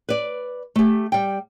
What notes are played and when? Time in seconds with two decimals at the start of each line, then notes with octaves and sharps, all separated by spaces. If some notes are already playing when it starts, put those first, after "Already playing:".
0.09 B4 D5
0.76 A3 G4
1.12 G3 G5